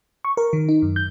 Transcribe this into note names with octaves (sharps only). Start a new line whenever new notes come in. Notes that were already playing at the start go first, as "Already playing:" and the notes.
C#6
A#4
D#3
D#4
F#2
G6